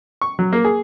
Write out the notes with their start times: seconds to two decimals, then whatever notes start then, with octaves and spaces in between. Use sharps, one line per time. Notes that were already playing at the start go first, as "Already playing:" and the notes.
0.22 C#6
0.39 F#3
0.53 A#3
0.65 G#4